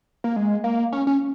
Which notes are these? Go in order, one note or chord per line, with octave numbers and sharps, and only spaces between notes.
A#3
G#3
A#3
C#4
C#4